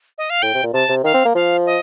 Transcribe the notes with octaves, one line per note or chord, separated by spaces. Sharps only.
D#5
F5
A2 G5
C3
A#2
C3 A5
C3
D#3 F5
C4
A#3
F3 F5
D#5